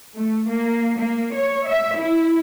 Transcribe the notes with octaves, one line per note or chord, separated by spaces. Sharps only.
A3
A#3
A#3
C#5
E5
E4